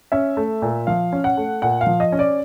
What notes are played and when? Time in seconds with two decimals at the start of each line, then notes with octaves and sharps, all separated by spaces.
0.12 C#4 E5
0.37 A3
0.62 A#2
0.87 F3 F5
1.12 C#4
1.24 F#5
1.37 A3
1.62 A#2 F#5
1.81 F5
1.87 F3
2.00 D#5
2.12 C#4
2.19 D5